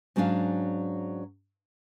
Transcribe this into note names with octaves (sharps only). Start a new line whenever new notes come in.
G#2 F#3 C#4 D4 F5